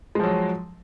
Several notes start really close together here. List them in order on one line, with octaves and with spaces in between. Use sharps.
G#3 F3 F#3